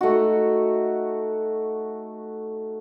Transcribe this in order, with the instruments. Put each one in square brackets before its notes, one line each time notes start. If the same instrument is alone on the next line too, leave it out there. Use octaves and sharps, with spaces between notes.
[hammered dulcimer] A3 D#4 F#4